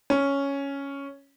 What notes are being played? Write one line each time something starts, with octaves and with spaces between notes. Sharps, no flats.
C#4